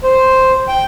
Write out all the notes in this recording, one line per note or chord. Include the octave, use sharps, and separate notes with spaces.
C5
G5